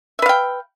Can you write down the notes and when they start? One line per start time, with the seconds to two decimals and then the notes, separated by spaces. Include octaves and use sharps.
0.19 E5
0.22 B4
0.26 F5
0.29 G5